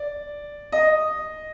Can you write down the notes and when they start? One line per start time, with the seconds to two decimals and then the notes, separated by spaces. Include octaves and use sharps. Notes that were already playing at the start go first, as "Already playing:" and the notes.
Already playing: D5
0.72 D#5